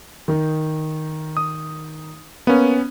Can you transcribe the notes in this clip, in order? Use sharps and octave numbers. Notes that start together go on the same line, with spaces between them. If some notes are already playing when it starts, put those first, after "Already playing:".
D#3 D#4
D#6
A#3 B3 C#4